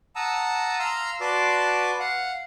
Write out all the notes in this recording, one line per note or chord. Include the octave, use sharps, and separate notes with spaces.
F#5 A5 A#5 D#6 E6
F5 A#5 C6 E6 F6
F#4 B4 D5 A5 C6 D6
F5 F#5